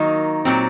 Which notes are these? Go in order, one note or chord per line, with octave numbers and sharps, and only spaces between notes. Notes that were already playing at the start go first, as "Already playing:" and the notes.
Already playing: D#3 F#3 A#3 D#4
A#2 F#3 C4